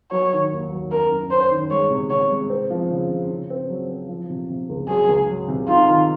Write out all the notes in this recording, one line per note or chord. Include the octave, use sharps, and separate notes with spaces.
F#3 C#5
D#3
D#2
F#3
F#2 A#4
F#2
C#4 C5
D#3
G#3 C#5
C3
C3 C#5
G#3
C4
F3
C#3
C#3
C#3
C4
F#3
C4
F3
C3
C3
C#2
F#3 G#4
C#2
F#3
C3
D#4 F4
D#3